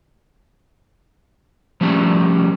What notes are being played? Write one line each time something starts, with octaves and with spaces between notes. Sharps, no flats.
F3 G3 A3 C#4